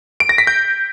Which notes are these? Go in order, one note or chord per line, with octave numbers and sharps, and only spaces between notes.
D7
A#6
B6
G6